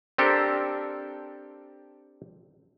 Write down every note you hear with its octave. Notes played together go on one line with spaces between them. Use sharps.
C4 D4 G4 A4 A#4